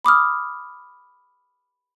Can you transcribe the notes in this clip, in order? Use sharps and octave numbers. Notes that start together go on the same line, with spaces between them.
B5 D6 D#6 F6